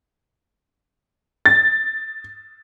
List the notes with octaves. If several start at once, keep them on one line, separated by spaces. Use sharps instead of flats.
A6